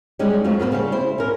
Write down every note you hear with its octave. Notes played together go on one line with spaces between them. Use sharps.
G3 G#3 C#4 D#4 G4
F2 F3 F#3 A3
A#3 B3 A4 C5
C#3 G3 G4
E4 C5
C#4 A#4